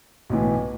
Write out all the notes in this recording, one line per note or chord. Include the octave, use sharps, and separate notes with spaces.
B1 A2 E3